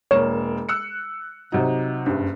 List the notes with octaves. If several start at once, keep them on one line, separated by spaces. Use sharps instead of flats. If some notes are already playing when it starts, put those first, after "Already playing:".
E1 A#3 C#5 E7
E6 F#6 C#7
C3 F#3 D#4
F#1 G2